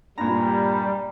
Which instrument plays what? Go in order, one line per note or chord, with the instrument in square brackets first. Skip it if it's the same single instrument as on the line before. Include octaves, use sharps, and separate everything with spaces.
[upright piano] G2 A#2 [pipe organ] G3 [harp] A#5